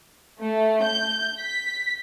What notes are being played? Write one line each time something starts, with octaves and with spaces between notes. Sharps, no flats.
A3
G6
B6